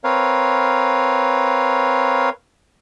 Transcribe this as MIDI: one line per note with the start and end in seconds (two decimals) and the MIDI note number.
0.04 2.29 60
0.04 2.29 70
0.04 2.29 71
0.04 2.29 73
0.04 2.29 77